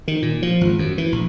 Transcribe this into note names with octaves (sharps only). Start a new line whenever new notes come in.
D#3
A#2
F3
G#1
F#2
E3
A#1